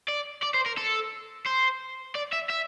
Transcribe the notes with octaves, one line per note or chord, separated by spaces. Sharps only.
D5
D5
C5
A#4
A4
C5
D5
E5
E5